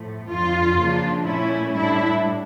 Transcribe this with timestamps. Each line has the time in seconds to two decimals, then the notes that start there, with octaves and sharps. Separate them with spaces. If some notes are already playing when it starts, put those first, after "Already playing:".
Already playing: A2 F3 A3
0.28 F2 D3 F3 F4
0.77 C#3 F3 A#3 D4
1.25 A#2 A3 C#4 E4
1.74 A2 G3 D4 E4